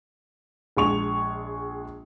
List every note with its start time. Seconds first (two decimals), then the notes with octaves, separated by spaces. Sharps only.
0.77 A#1 G#3 C#6 F7